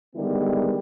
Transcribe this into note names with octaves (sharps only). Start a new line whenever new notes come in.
D3 D#3 G3 G#3 B3 E4